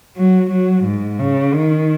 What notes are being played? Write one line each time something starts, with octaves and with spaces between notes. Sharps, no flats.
F#3
F#3
G#2
C#3
D#3